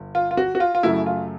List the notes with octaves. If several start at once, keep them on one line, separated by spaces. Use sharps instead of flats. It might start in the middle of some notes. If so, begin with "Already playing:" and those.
Already playing: G1
F4
F4
F#4
F#4
F4
F4
F#2 C#3 F#3 A3 E4
F4